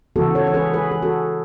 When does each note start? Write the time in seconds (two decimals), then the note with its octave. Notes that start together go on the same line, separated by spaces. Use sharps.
0.16 C#3 E3 B3 F#4 A4
0.35 A4 C#5
0.47 C#5
0.54 G#4 B4
0.73 G#4 B4
0.91 G#4
1.02 F#4 A4